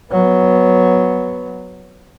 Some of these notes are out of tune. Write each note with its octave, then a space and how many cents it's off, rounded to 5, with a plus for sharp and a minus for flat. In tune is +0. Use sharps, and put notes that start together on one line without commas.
F#3 +0 B3 +0